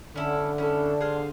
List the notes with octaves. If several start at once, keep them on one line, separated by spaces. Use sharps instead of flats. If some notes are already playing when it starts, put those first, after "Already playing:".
D3 C#4 D4 E4 A4
C#4 E4 A4
G#4 C5 F5